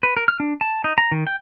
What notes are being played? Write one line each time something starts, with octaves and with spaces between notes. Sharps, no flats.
B4
A#4
F6
D4
A5
D#4
A#5
D#3
G5